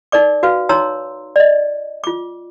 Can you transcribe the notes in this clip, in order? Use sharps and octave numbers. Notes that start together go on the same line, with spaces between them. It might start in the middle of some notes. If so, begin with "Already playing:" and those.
D#4 A#4 D5 D6
F#4 B4 F5
D#4 C#5 A#5 C6 E6
D5 D#5
F4 D6